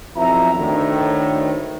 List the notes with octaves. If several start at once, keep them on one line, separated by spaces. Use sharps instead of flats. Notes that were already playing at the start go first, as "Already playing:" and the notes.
B1 F2 B2 E4 E5 A#5
D2 A2 D#3